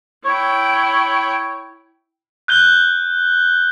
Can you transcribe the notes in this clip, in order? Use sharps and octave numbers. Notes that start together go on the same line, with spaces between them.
E4 C#5 G5
F#6 G6 G7